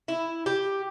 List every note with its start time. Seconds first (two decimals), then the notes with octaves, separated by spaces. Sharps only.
0.08 E4
0.46 G4